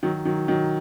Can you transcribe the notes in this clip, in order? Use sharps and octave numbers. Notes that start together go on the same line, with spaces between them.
D#3 F#3
D#3 F#3
D#3 F#3